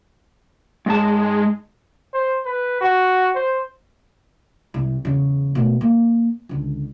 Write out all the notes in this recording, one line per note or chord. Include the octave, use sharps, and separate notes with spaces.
G#2 G#3 A5
C5
B4
F#4
C5
C2
E2 C#3
B2 A3
A#3
C#2 D3